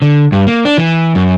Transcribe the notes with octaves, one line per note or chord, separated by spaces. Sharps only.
D3
G2
A#3
D4
E3
F#2